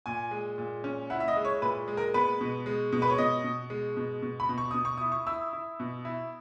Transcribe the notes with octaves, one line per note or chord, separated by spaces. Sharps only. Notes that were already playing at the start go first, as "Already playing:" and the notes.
A#2 G#5
G#3
A#2
C#4
E4 F#5
E5
D#5
G#3
C#5
A#2 B4
G#3
A#4
B3 B4
B2
G#3
B2
B4
C#5
B2 D#5
B2
G#3
B2
B2
B5
B2
C#6
B2 D#6
C#6
E4 D#6
C#6
E4 E6
E4
B2
E4